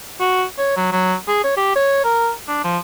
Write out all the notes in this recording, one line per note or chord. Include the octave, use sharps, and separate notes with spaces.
F#4
C#5
F#3
F#3
G#4
C#5
G4
C#5
A#4
D4
F3